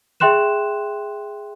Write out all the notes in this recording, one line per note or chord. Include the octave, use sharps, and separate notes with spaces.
G#4 E5 G5 C6 F#6 E7